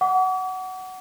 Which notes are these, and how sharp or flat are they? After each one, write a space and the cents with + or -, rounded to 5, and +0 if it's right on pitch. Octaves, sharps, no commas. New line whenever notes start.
F#5 +10 D6 -45